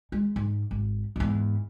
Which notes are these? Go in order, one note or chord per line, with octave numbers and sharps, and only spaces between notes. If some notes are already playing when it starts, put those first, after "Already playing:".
G#3
G#2
G#1
E2 G#2